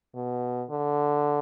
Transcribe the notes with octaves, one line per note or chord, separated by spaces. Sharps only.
B2
D3